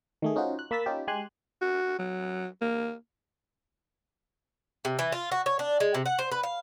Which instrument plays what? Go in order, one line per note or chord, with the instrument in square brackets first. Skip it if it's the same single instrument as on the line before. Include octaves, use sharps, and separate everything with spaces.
[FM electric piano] D#3 A3 G#4
C#4 D#4 F4 F#4 C5
F#6
A#3 B5 E6 A6 B6
C#4 D#4 F4 G4
G#3 G4 G#5 C6 F#6
[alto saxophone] F#4
F#3
A#3
[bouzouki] C3
E3
F4
F#4
C#5
D4
G#3
C3
F#5
C5
B4
F5